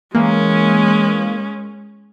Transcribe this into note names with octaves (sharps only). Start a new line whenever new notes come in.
E3 G#3 A#3 C#4